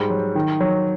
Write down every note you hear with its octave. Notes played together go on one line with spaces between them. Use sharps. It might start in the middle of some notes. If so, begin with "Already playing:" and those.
Already playing: G#2 G3
F#3
D#3
F#3